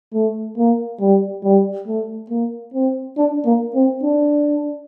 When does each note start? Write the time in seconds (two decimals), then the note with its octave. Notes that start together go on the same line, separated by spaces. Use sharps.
0.14 A3
0.57 A#3
1.00 G3
1.43 G3
1.87 A3
2.30 A#3
2.73 C4
3.17 D4
3.45 A#3
3.74 C4
4.03 D4